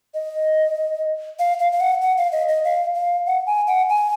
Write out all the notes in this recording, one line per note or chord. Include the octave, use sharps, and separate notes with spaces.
D#5
F5
F5
F5
F#5
F#5
F5
D#5
D#5
F5
F5
F#5
G#5
F#5
G#5